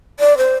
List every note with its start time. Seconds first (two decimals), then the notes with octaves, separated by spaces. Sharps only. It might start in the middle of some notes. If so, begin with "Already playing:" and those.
0.20 D5
0.38 C5